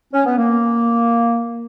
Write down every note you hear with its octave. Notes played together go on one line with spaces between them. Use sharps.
C#4
B3
A#3